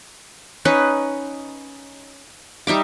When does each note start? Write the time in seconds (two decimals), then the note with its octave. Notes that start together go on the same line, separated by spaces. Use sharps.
0.65 C#4 D#4 B4
2.67 G3 D#4 E5 D6